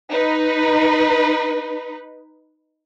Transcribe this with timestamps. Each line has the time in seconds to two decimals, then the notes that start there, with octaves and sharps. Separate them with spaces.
0.11 D#4 B4